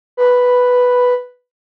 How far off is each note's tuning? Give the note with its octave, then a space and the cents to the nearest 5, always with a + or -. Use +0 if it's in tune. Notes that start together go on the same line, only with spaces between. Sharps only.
B4 +0